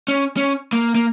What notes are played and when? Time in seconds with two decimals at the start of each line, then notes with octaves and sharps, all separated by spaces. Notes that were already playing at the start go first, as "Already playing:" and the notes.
0.08 C#4
0.37 C#4
0.73 A#3
0.95 A#3